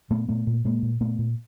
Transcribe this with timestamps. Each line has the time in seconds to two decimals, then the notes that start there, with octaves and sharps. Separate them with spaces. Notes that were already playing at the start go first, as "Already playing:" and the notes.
0.10 A#2 A3 B3
0.28 A#2 A3 B3
0.47 A#2
0.65 A#2 G#3 A#3
0.82 A#2
1.00 A#2 A3 B3
1.19 A#2